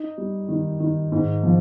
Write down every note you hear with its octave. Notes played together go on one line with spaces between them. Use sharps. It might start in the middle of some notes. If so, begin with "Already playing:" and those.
Already playing: D#4
G3
D#3
D#3
G#2
F3